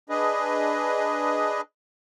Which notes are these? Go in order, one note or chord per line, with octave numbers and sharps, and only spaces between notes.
D4 G#4 B4 D#5